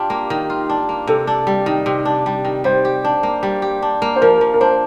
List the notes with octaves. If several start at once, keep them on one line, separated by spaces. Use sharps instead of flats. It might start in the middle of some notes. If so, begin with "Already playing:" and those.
Already playing: D4 F4 G4
A#3
D#3
F4
D4
A#3
C3 A4
D4
G3
D#3
C3
D4
G3
D#3
G3 C5
G4
D4
A#3
G3
G4
D4
A#3
C5
F3 A#4
F3
A#4
D4 C5